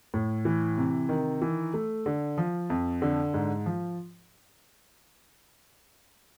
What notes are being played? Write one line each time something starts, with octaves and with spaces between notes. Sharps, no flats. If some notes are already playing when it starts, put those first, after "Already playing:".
A2
E3
C3
D#3
E3
A3
D3
F3
F2
D3
G#2
F3